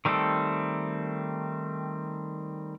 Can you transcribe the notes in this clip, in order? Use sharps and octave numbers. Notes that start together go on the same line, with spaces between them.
D#3 G3 A3 C4 A4